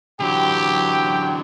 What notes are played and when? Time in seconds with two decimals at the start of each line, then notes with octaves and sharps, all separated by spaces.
0.21 D3 E3 F#3 G4 G5